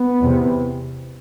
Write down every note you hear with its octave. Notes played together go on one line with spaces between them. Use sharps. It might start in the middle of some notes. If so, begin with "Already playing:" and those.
Already playing: B3
E2 C3